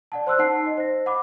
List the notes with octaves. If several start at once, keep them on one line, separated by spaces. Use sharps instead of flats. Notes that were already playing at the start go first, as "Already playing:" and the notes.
D5 F#5 A5
C5 C6 E6 F#6
D#4 F#5 A5 C7
D#5
C5 A#6
F#5 B5 D6